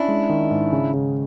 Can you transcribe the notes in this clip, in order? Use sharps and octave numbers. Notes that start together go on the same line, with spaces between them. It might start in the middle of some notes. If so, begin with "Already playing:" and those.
Already playing: C#4 D4 E4
G#3
D#3
G#2
C#3
C#3